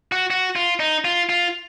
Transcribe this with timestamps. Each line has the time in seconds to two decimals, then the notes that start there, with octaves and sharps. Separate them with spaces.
0.12 F#4
0.31 F#4
0.56 F4
0.80 D#4
1.05 F4
1.29 F4